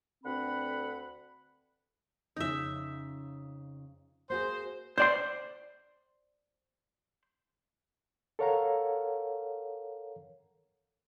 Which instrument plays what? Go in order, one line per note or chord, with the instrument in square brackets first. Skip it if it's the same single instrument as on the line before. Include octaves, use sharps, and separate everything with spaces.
[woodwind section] D2 D3 C4 B4 F#5 B5
[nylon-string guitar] F2 C#3 C#4 [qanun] D#4 E5
[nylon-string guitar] A#3 F#4 G#4 [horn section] C5
[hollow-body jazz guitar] C5 D5 C6
[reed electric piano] A4 A#4 C#5 F5 F#5 A#5